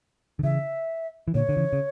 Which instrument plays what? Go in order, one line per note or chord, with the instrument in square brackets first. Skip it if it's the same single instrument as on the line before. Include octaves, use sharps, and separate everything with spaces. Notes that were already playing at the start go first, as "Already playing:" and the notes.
[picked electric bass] D3
[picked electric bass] C#3 E3 [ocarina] E5
[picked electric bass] E3
[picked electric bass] A#2 D3 [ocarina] C#5
[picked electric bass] D3
C#3 E3
C#3